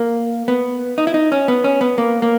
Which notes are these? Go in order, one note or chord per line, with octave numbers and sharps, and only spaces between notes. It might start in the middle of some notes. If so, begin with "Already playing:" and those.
Already playing: A#3
B3
D#4
E4
D#4
C#4
B3
C#4
B3
A#3
A#3